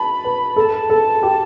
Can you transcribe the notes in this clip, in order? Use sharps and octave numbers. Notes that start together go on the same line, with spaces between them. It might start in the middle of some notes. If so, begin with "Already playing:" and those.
Already playing: A5 B5
B4
A4 A5 B5
A4
G4